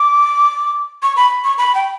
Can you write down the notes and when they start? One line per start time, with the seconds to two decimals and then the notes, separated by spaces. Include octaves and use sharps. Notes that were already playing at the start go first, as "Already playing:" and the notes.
Already playing: D6
1.03 C#6
1.17 B5
1.44 C#6
1.58 B5
1.75 G5